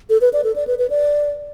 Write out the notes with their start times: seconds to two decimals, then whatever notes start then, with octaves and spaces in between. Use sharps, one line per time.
0.10 A4
0.21 B4
0.33 D5
0.44 A4
0.56 D5
0.67 B4
0.79 B4
0.90 D5